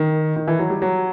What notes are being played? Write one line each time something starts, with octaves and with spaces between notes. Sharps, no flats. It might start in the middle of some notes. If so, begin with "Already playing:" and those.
Already playing: D#3
D#3
E3
F#3
G3
F#3